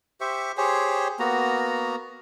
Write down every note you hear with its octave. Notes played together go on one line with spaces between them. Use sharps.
G4 C5 E5 C#6
G4 G#4 C5 C#5
A#3 B3 F#4 A#5